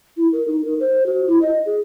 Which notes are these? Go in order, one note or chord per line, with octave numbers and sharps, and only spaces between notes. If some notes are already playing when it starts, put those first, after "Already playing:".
E4
A#4
D#4
A#4
C5
F#4
E4
D#5
G#4